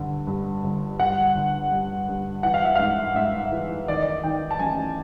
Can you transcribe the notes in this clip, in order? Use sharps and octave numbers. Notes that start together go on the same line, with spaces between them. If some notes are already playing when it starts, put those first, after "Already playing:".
Already playing: G2 D3
G2
G1
G2 F#5
D3
G2
G2
E3 F#5
F5
E5
G#2 F5
G#2 E5
E3
D#3 D5
D#5
D5
D#3 G5
A5
A1 G#5